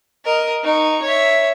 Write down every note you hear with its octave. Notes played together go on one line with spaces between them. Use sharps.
A#4 D#5
D#4 C#6
C#5 E5